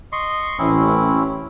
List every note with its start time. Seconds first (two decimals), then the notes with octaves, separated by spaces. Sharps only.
0.12 D#5 C6 C#6
0.59 A1 C4 C#4 E4